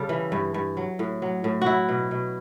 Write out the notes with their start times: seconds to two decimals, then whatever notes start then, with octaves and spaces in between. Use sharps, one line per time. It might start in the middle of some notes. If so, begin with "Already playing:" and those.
Already playing: C#3 G3 A4
0.09 E3
0.32 G2
0.54 G2
0.77 F#3
0.99 A2
1.22 F#3
1.44 A2
1.62 F#3 E4 F#4
1.89 B2
2.11 B2